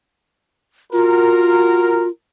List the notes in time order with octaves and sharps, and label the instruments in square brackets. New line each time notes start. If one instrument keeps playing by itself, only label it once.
[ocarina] F4 [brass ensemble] F#4 A#4